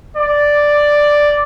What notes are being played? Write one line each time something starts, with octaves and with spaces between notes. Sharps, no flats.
D5